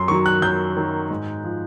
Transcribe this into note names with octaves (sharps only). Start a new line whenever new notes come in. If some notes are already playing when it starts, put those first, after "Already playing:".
Already playing: F#2 C6
D#3 F#3 C#6
F#6
F#2 G6
D#3 F#3
G#2
F3